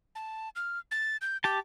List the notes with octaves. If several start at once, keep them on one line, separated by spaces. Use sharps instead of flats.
A5
F6
A6
G6
G4 A5 D6